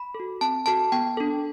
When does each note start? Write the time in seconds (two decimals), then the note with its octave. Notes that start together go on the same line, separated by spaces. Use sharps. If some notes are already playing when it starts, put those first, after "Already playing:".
Already playing: B5
0.15 A4
0.20 F#4
0.41 C4 A5
0.66 F#4 A4 A5
0.92 B3 G5
1.17 D4 A4